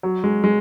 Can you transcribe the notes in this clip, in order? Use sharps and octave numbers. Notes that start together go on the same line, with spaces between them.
F#3
G#3
G#3